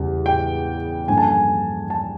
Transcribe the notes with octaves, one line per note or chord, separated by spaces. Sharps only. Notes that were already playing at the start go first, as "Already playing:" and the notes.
Already playing: E2 C#3 E3 G3
G5
G2 D3 F3 A#3 C#4 G#5
A5
G#5
A5